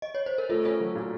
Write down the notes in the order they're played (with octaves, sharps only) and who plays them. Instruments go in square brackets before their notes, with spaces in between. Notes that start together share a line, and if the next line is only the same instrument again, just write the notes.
[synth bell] D#5
C#5
C5
A#4
[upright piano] A3 [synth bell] F4 A4
[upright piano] C#4 [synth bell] F4 A4
[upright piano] F#3
A#2